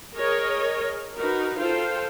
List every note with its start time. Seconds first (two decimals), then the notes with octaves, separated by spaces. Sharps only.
0.15 G#4 A#4 C#5 D#5
1.17 D#4 F#4 A#4 B4
1.58 F4 A4 C5 F5 G5